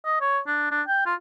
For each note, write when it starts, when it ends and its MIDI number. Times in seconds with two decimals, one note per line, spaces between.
0.06 0.19 75
0.21 0.39 73
0.47 0.68 62
0.71 0.82 62
0.87 1.02 79
1.06 1.14 65